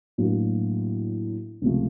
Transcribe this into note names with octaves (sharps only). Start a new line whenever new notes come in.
A2 F#3 A#3 D4 F#4
C#2 C3 F3 A3